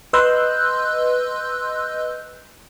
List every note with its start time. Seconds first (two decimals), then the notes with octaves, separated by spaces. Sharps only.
0.13 B4 D#5 C6 E6 F#6 G6